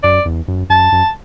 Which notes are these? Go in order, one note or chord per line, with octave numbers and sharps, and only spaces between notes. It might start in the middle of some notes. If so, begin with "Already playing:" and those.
F#2 D5
E2
F#2
F#2 A5
F#2